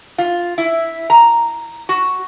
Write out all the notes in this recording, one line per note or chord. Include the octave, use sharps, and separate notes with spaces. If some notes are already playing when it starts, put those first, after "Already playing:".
F4
E4
A#5
F#4